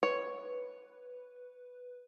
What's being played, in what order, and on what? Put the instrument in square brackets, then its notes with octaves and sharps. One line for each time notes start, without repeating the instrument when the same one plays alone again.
[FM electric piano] B4 [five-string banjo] C#5